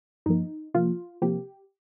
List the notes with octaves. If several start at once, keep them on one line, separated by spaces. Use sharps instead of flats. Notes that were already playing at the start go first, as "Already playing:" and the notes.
G2 F3 A#3 D#4
C3 F3 A#3 F4
C3 F3 A#3 G4